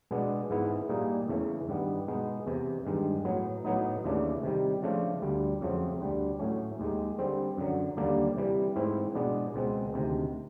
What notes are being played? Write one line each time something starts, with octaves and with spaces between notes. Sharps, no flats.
B2 G#3 B3 D4
G#2 E3 G#3 B3 E4
A#2 G3 A#3 D#4 G#4
E2 C#3 E3 A3 C#4
G2 D#3 G3 B3
B2 G#3 B3 D#4
E2 C3 E3
G2 D#3 G#3
A2 F#3 B3
A2 F#3 B3 D#4
D#2 C#3 E3 A3 D4
C3 D#3 G3
C#3 F3 A3 D4 F4
D2 D3 G3
F2 C#3 F#3 A3 C4
D2 D3 G3
A2 F#3 A3 C#4
D#2 D#3 G#3
D3 G3 C4
F#2 D3 F#3
D#2 D3 G3 A#3 D4
C3 E3 G3
G#2 E3 A3 C4 E4
B2 G#3 B3 D4
C#2 B2 G#3 C4
D2 C3 D#3